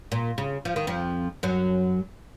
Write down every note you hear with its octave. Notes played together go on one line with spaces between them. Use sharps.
A#2
C#3
F3
D#3
F2 F3
F#2 F#3